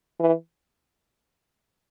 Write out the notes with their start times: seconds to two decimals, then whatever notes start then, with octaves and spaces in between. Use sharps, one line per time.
0.20 E3